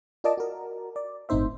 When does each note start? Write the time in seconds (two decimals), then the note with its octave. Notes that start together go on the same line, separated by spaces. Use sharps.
0.24 F4 A#4 D5 D#5 A5 D6
0.38 F#4 A#4
0.96 D5
1.29 G1 A2 C4 D#4 C5 E5